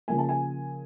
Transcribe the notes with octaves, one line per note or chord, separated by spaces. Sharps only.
C#3 F3 A#3 G#5
A5
G#5